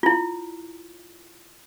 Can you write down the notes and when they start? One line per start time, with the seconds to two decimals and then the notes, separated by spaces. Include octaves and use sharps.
0.03 E4 F4